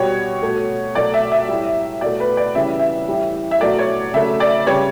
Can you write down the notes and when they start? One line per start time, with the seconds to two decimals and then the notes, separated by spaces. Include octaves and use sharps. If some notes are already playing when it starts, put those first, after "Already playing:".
Already playing: B2 G3 C#5
0.42 B2 A3
0.95 B2 F#3 A3 D5
1.14 E5
1.32 E5
1.48 A2 G3
2.01 B2 A3 D5
2.20 B4
2.37 D5
2.55 C#3 E3 G3 E5
2.79 E5
3.08 A2 E3 G3
3.51 E5
3.61 B2 F#3 A3 D5
3.79 C#5
4.14 C#3 F#3 A3 E5
4.40 D5
4.67 C#3 G3 C#5